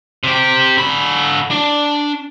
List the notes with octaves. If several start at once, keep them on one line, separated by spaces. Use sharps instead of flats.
C3 G4
D3 B5
D4